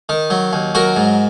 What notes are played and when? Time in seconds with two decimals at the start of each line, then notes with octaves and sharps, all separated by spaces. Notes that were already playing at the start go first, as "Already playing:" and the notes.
0.09 D#3
0.30 F#3
0.53 D#2
0.75 F#3 F#4 A#4
0.96 G#2